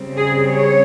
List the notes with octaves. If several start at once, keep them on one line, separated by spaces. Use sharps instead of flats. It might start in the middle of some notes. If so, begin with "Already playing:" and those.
Already playing: C#3 G3 C4
G#4
C#5